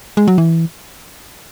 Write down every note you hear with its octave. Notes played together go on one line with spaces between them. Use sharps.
G#3
F#3
E3